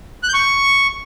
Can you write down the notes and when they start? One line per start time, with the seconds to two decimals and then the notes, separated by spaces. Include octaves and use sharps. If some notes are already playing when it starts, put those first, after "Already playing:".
0.23 F#6
0.29 G6
0.34 C#6